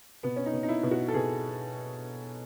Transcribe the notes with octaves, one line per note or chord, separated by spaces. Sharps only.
B2 B3
C#4
D#4
B2
D#4
E4
B2
F#4
A4
B2 G#4